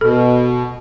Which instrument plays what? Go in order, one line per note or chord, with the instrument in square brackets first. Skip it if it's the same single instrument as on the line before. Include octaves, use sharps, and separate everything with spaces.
[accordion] B2 [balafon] A4